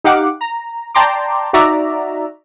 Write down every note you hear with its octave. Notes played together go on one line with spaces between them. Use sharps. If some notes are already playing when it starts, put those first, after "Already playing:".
D#4 G4 F5 F#5 D6
A#5
D5 G5 A5 A#5 C6 D6
D#4 F#4 D5 E5 A#5